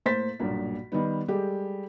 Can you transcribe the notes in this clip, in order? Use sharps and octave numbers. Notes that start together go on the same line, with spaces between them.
A2 A#3 C5 A6 B6
B1 G2 A#2 A#3
D#3 G3 B3
G3 G#3 G4 A4